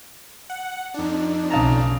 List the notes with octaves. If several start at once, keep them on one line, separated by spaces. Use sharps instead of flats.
F#5
F2 D4 D#4
B1 C#3 A5 A#5